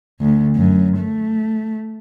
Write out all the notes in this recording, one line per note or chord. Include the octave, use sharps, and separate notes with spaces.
D2
F#2
A3